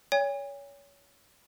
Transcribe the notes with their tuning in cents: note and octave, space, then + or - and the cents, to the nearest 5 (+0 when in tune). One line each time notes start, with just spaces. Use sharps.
C#5 +25 G#5 -45